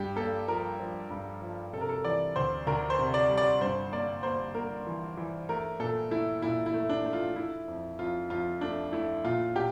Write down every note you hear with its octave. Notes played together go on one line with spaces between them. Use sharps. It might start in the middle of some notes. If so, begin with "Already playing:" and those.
Already playing: G2 G4
A#3 A4
F3 A#4
F3
G2
F3
C3 A4
A#4
A4
E3 D5
D2 C5
D2 A#4
C5
C3
D5
G3
D5
G2 C5
A#3 D5
A#3 C5
A#3 A#4
E3
E3
A3 A#4
A#2 A4
A3 E4
A#2 E4
E4
A3
D4
A3
F4
A3 E4
F2
F2 F4
F2 F4
A3 D4
A3 E4
A#2 F4
A#2 G4